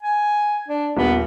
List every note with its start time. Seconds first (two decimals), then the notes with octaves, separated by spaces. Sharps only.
0.03 G#5
0.68 D4
0.97 D#1 B3